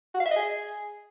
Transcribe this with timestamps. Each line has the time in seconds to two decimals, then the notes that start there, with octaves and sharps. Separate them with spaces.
0.15 F#4
0.20 F5
0.25 E5
0.31 D#5
0.36 G#4